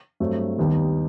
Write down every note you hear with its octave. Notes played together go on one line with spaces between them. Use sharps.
G2 F#3 A3 C4
D#2 D#3 G3 B3 D#4